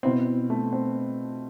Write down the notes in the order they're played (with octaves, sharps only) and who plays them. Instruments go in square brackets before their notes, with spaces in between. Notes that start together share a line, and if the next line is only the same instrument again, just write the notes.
[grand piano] B2 B3 E4 [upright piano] C4
[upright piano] A3
C4